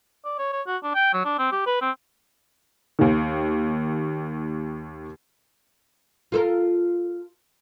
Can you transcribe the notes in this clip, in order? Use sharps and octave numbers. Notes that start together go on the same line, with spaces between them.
D5
C#5
C#5
F#4
D4
G5
F#3
D4
C4
G4
B4
C4
D#2 D#3
F4 A4 A#4